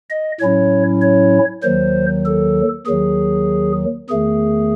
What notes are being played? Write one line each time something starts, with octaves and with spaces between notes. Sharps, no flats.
D#5
A2 F#3 C#4 E4 C#5
C#5
D#2 D#3 F#3 C5
A4
D#2 D#3 F#3 G#4
E2 D#3 A3 G#4